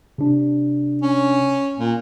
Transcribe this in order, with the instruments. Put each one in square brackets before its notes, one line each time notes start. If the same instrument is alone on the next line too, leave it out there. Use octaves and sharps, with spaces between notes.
[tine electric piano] C3 D4
[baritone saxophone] C#4
A#2